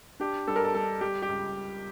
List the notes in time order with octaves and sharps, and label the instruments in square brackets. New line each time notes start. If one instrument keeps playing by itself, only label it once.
[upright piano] D4 G4
G2 A4
A#4
A4
G2 A4
G3 G4
G4
C#2